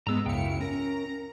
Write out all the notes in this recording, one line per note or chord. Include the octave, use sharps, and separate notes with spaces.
G#2 G#3 B3 A#5 E6
C#2 F#2 E4 F5 G5 C#7
C#4 A#4 A#5